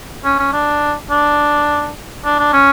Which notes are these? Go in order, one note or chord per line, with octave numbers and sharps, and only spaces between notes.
C#4
C#4
D4
D4
D4
D4
C#4